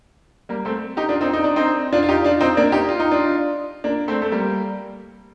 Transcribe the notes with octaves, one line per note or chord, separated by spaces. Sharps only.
G3 A#3
A3 C4
D#4 G4
D4 F4
C4 D#4
D#4
D4
C4 D#4
D4 F4
F4
D#4 G4
D4 F4
C4 D#4
A#3 D4
D#4 G4
F4
D#4
D4 F4
A#3 D4
A3 C4
A3
G3 A#3